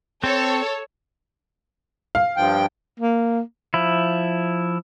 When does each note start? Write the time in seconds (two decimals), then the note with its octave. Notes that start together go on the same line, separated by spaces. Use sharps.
0.24 C4 A4 C#5
2.15 F5
2.37 G2 F3 G5
3.00 A#3
3.74 F3 E4